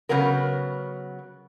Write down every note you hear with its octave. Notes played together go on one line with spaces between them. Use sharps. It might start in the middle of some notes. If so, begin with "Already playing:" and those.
C#3 F#3 B3 A#4